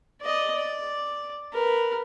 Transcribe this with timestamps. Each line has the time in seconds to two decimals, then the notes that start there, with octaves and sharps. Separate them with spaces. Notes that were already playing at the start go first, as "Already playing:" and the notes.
0.21 D5 D#5
0.56 D5
1.53 A#4 B4